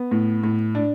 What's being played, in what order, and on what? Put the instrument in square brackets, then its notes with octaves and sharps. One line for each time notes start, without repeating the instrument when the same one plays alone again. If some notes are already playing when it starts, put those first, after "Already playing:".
Already playing: [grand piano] B3
A2
A2
D4